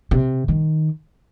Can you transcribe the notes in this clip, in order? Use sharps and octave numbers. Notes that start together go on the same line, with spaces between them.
C3
D#3